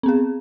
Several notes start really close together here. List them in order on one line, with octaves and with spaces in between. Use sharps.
C4 B3 G#4